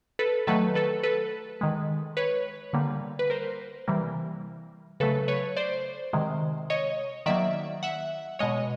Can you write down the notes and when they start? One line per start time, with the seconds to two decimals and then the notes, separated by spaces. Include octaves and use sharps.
0.19 A4 B4
0.47 D#3 F#3 A3 A4 B4
0.75 A4 B4
1.03 A4 B4
1.61 D#3 G#3
2.17 B4 C#5
2.73 D3 G3 A#3
3.19 B4
3.30 A#4 C5
3.88 C3 E3 G3 A#3
5.00 C#3 F#3 A3 A4 B4
5.28 B4 C#5
5.56 C5 D5
6.13 C3 D#3 G#3
6.70 C#5 D#5
7.26 D#3 F#3 A#3 D5 E5
7.83 E5 F#5
8.39 B2 G#3 C#5 D#5